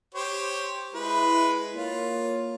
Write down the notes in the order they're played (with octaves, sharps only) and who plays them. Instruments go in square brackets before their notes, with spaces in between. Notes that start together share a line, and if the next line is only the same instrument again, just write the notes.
[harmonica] G4 C5 C#5
[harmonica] G#3 B4 [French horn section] E4
[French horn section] A#3 C#5 [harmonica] F4